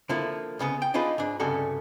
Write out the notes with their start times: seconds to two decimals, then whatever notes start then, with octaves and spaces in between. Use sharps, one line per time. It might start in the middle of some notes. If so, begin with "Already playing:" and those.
0.09 D3 F3 A#3 E4
0.59 C2 C#3 B3
0.82 G5
0.94 D4 D#4 F4 G#4 B4
1.18 G#2 D4
1.40 C2 G2 C#3 G3 F#4 A4